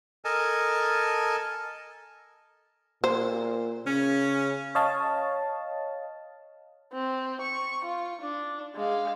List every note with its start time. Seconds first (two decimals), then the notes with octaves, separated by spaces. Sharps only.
0.25 A4 A#4 D#5 G#5 A5
3.04 A#2 C5
3.86 C#3 C#4
4.75 C#5 D#5 F5 A5
6.93 C4
7.42 C#6
7.85 F4
8.22 D4
8.76 G#3 F5